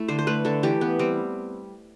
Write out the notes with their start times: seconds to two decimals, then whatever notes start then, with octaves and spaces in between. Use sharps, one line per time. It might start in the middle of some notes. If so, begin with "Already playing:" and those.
Already playing: A3 E4
0.08 D3 C5
0.19 C5
0.27 A3 B4
0.45 D3 A4
0.63 E3 G4
0.81 B3
0.99 G3 C4